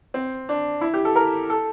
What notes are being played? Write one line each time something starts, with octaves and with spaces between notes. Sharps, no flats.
C4
D4
E4
G4
A4
A#4
A4